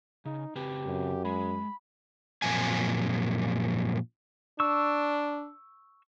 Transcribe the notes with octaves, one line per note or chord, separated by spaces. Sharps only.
C#3 D#4
C#3 C4 G4 B4
F#2
G#3 B5
F#2 A#2 F3 C4 G#5
D4 C#6 E6